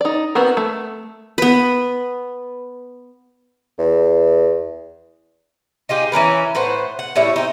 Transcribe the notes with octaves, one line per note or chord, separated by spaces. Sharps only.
D#4 D5
B3 C4 F#4 A#4
A3
B3 B4
E2
D#4 F4 G4 G#4
E3 C#4 A#4 B4
A2 B4 C5 F#5
F#5
A2 G3 E4 C#5
C4 D#4